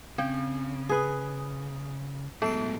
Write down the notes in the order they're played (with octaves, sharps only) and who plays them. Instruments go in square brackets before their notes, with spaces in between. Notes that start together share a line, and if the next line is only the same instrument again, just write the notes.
[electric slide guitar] C#3 [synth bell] C4 [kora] G5
[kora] G#4 B4 [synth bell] D#6
[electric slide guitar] A2 F#3 G#3 [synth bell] B3 C7 D7 [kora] A4